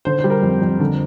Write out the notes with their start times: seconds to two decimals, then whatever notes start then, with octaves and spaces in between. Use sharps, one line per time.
0.05 D3 C5
0.19 C5
0.24 G3
0.30 A#4
0.43 F2
0.62 F2
0.80 D3